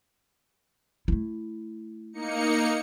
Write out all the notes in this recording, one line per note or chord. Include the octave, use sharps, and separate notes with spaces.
A3 E4
A#3 D#4 C#7